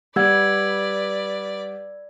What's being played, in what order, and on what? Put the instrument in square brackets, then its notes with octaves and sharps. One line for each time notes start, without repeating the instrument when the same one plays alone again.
[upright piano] G3 F#5 [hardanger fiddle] B4 D5 [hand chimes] E6 G#6